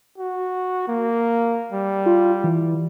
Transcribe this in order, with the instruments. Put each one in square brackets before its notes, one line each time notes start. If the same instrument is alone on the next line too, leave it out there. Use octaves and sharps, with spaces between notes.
[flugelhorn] F#4
A#3
G3
[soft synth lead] F4
E3